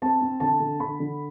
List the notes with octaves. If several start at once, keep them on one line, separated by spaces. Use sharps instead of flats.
C4 A5
C4
D3 A5
D3
D3 B5
D3